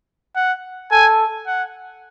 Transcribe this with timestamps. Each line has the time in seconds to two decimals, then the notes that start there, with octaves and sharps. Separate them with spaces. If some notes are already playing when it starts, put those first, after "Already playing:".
0.36 F#5
0.91 A4 G#5
1.47 F#5